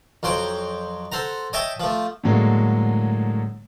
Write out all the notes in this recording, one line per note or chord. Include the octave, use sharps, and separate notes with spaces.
F2 F#3 C5 G5
A4 C5 F#5 A#5
C#5 D#5 E5 G5 A5 C#6
F3 A3
A2 D3 F#3 G#3 A#3